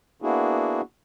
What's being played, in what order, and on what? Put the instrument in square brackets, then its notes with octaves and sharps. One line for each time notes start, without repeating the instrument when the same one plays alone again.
[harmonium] A#3 B3 D4 E4 F#4 G#4